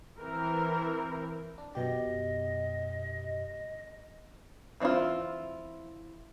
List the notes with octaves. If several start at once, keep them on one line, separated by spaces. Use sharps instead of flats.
E3 C4 A#4
D4
F#2 B2 G4 D#5
E3 C4 D4 E4 F4